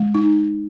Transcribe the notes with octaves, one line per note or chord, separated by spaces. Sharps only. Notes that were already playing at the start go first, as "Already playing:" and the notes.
Already playing: G#3
D#4